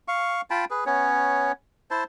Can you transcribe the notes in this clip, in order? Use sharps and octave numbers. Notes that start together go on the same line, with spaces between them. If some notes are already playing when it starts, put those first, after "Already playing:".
F5 C#6
F4 G5 A5 B5
G#4 B4
B3 C#4 C#5
E4 C5 A5